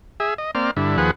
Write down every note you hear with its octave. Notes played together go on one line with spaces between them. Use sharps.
G#4 E5
D#5
A#3 C4 D5 F6
G2 D3 E4
D#2 F3 G#4 B4 F#5